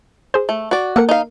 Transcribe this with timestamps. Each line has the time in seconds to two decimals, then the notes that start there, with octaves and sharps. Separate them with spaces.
0.34 G#4 C5
0.49 A3
0.71 F#4 D5
0.96 A#3 A4 A#4 F#5
1.09 D#4 F5